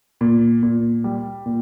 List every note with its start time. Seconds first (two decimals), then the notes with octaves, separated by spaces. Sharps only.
0.21 A#2
0.63 A#2
1.04 G3
1.46 A#2